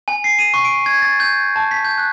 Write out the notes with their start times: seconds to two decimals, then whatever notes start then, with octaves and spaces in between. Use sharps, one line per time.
0.08 G#5
0.24 C7
0.39 D#7
0.54 C#6
0.65 D7
0.86 G#6
1.02 A6
1.20 G6
1.56 A5
1.71 B6
1.85 G6
1.98 F#6